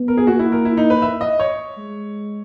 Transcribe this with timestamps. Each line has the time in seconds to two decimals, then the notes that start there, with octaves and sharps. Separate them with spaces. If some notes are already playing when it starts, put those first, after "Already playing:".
Already playing: B3
0.08 A#4
0.17 G#4
0.27 A#3 F#4
0.39 E4
0.52 A#4
0.65 E4
0.77 D#4
0.90 B4
1.02 E5
1.21 D#5
1.40 C#5
1.78 G#3